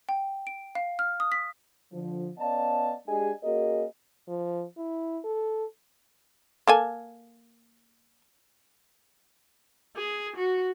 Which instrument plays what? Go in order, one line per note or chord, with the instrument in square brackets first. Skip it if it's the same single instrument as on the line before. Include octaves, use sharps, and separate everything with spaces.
[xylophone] G5
D7
F5
F6
D#6
B6
[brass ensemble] D3 F3
B3 C#4 D5 D#5 F5 A5
G#3 D4 G4 G#4 D#5 G#5
A#3 C#4 F#4 G#4 A#4 D#5
[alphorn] F3
E4
A4
[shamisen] A#3 A4 G#5
[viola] G#4
F#4